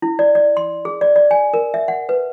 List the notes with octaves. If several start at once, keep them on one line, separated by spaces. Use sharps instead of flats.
E4
D5
D5
C6
G#4
D5
D5
G#5
A#4
E5
F#5
B4